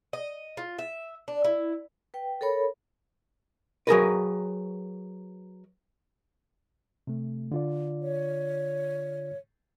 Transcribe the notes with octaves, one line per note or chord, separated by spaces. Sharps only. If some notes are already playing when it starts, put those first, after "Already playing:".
D#5
F4
E5
D4
E4
B4 G5
A4 A#4 C#5 B5
F#3 G#4 A#4 B4
C3 A3
D3 F4 D5
C#5